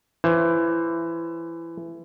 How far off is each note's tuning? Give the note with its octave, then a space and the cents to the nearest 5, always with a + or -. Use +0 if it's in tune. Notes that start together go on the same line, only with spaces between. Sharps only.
E3 +20 C5 +30